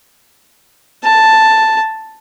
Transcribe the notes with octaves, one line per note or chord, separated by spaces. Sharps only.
A5